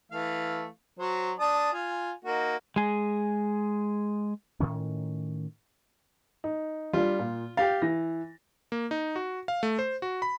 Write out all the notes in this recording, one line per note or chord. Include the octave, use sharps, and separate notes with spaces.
E3 A3 F5
F#3 C5
D4 A5 D#6
F4 G#5
A#3 D#4 F#4
G#3 G#4
A2 D#3 C#4
D#4
G3 D4 F4
A#2
G4 F5 G5 A6
E3 A#6
A#3
D#4
F#4
F5
A3
C5
F#4
B5